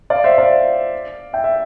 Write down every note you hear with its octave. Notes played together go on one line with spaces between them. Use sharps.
D5 F5
C5 E5
D5 F5
E5 G5
E5